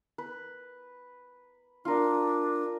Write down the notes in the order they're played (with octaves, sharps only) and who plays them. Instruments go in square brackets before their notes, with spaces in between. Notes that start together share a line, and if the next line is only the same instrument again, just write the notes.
[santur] B4
[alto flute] D4 [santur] F4 A#4